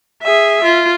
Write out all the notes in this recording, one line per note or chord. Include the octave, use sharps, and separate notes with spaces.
G#4 E5
F4